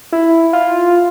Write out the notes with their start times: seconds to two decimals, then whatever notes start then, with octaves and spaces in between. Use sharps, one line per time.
0.12 E4
0.53 F4